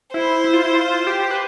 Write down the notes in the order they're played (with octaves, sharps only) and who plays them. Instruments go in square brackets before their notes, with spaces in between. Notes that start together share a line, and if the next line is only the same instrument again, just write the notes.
[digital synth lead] E4 [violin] C5
[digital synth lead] E4
F4
E4
F4
G4
B4